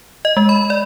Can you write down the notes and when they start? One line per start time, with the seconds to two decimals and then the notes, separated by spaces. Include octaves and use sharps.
0.25 D#5
0.37 G#3
0.49 B5
0.70 D5